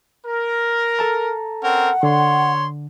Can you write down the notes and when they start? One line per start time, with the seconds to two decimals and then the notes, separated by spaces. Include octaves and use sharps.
0.27 A#4
0.99 A4 A5 A#5
1.63 C4 C#4 A#4 F#5
2.03 D3 C#5 C6